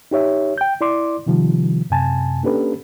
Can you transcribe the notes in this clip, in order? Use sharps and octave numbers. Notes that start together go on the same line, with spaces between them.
D#4 G4 C#5 E5
G5 G6
E4 D5 C6 D6
C3 D#3 F3 G3
F#2 C3 G#5 A5
A#3 C#4 D4 G4 A4 B4